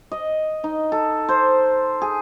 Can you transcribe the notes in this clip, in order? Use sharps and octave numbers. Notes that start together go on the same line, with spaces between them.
D#5
D#4
A4
C5
G#4